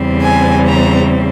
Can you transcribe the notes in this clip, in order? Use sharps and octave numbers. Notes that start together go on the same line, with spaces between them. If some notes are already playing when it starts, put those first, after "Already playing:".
Already playing: E2 C#3 G3 C4
G#5
A#5